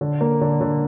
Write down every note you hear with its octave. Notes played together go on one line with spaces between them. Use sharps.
D3
A#3
D3
D3